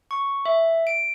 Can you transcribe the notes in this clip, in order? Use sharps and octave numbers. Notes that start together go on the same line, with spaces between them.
C#6
E5
D7